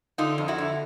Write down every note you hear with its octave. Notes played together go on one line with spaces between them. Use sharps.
D3 D#4 F4
F2
E4 F#4
D3